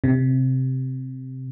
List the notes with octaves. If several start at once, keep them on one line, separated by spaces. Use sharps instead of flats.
C3